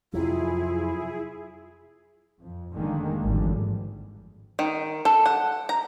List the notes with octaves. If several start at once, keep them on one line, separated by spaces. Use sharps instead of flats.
F2 C3 F#3 E4 F4 G#4
F2
F1 D3 D#3 G#3 A#3
G#1 F2 G#2 D3 E3 G3
D#3
A4
F#5
A#5